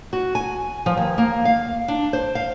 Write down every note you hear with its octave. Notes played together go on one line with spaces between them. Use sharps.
F#4
G#5
F3
D#2
A#3
F5
D4
C5
F5